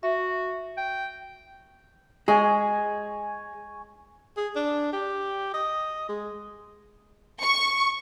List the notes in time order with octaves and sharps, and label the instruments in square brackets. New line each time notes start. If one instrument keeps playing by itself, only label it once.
[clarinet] F#4 [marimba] E5
[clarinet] G5
[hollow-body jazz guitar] G#3 G#4 [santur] C#5 G#5
[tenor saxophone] G#4
D4
G4
D#5
G#3
[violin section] C#6